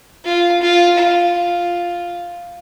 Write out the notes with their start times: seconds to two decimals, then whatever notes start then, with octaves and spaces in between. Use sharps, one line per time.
0.25 F4
0.62 F4
0.98 F4